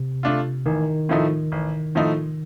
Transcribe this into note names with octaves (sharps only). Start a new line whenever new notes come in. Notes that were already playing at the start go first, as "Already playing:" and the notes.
Already playing: C3
A3 D4 F4
A1 D#3
A2 F3 A3 D#4
A1
A2 F3 A3 D#4